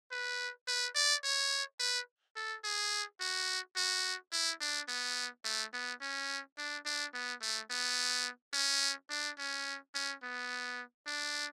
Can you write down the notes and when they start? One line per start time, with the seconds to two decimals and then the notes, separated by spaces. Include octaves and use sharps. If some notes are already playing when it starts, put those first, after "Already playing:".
0.11 B4
0.68 B4
0.95 D5
1.24 C#5
1.80 B4
2.36 A4
2.64 G#4
3.21 F#4
3.76 F#4
4.32 E4
4.61 D4
4.88 B3
5.44 A3
5.73 B3
6.01 C#4
6.58 D4
6.85 D4
7.14 B3
7.42 A3
7.70 B3
8.54 C#4
9.10 D4
9.39 C#4
9.95 C#4
10.23 B3
11.07 D4